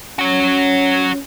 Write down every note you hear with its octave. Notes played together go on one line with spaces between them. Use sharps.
C#4 F#4 C#5